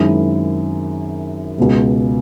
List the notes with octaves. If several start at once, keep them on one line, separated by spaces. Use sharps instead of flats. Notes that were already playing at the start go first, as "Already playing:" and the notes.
Already playing: F#2 D#3 G#3 C4 E4
C#2 B2 G#3